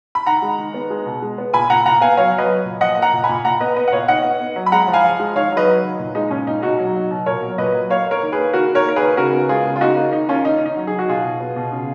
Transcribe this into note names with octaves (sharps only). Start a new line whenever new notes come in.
B5
D#3 F#5 A#5
G#3
D#3
B3
G#3
B2
G#3
B3
A#2 G#5 B5
A#2 F#5 A#5
A#2 F#5 A#5
B3 F5 G#5
F#3 C#5 F5
F#3
B4 D#5
F#3
A#2
F3 D#5 F#5
A#3
F#5 A#5
A#2
G#5 B5
A#2
A#2 F#5 A#5
B3 B4 D#5
B3 B4 D#5
F#5
A#2 C#5 F5
D#3 D#5 F#5
B3
B3
F#3
B5
G#3 F#5 A#5
F3
F5 G#5
F3
G#3
D#3 C#5 F5
F#3
B4 D#5
F#3
D#3
A#2
G#3 D#4
A#2 C#4
A#2 D#4
B2 D#4 F#4
F#3
F#3
B2
A#2 A#4 C#5
F#3
A#2 B4 D#5
F#3
A#3 C#5 F5
A#3 A#4 C#5
D#3
G#4 B4
A#3
D#3 F#4 A#4
D#3
A#4 C#5
A#3 A#4
G#4 B4
D#3
C#3 F#4 A#4
B3
G#3 F4 G#4
C#3
F4
A#3 D#4 F#4
A#3 D#4
D#3 D#4
A#3 C#4 F4
D#3 D#4
D#3
D#4
F#3
D#3 G#4
F#4
B2 F4 G#4
B2
B3
B2
C#3